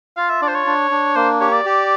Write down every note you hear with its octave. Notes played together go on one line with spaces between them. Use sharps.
F4 F5
E5
D4 D5
C5
C#5
D4
D4
A#3 C5
G4 C#5
D5
G4